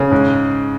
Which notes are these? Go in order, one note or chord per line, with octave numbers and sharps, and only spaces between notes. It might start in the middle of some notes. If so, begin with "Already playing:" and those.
Already playing: C#3
G#2